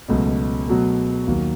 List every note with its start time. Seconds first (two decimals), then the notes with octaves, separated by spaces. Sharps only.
0.08 C#2 B2 F#3 A3
0.68 B2 F#3 A3
1.27 D#2 D#3 F#3 A#3